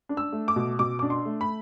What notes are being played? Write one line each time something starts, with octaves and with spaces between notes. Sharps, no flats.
D4
E6
A3
D6
B2
B2 D6
D4 D6
C6
A3
B5